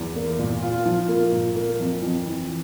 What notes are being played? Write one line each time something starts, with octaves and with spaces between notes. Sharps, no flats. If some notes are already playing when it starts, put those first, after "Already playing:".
Already playing: E2
A#3
A#2
F4
F3
A#3
A#2
A#3
F2
F2
E3